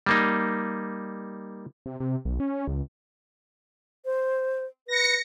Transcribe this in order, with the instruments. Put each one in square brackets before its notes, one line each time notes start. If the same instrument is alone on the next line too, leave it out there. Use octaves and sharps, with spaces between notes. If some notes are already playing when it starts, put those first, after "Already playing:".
[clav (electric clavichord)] G3 A#3 D#4
[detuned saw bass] C3
C3
B1
C#4
C#2
[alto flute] C5
[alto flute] B4 [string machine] A#6 C#7